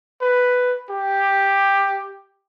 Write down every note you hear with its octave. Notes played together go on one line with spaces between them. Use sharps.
B4
G4